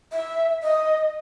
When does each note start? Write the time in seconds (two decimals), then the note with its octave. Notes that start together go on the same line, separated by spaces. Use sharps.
0.12 E5
0.63 D#5